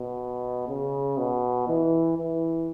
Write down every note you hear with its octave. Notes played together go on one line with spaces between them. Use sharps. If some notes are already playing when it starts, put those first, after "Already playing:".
Already playing: B2
C#3
B2
E3
E3